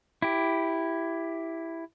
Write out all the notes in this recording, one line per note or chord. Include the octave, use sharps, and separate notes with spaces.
E4 G4